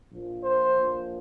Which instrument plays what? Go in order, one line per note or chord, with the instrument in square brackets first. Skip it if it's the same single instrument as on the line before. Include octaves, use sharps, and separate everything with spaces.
[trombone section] A#1 A#2 F3
C5
A#1 A#2 F3